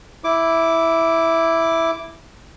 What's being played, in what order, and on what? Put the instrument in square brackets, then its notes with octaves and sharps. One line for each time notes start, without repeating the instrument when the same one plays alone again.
[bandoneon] E4 D6